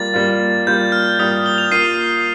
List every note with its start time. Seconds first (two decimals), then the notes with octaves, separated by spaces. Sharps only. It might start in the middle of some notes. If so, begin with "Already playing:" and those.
Already playing: G3 A#3 F4 A6
0.14 G3 A#3 F4
0.67 G3 A#3 F4 G6
0.92 F6
1.19 G3 A#3 F4 D#6
1.46 G7
1.58 F7
1.71 A#3 F4 C7 D#7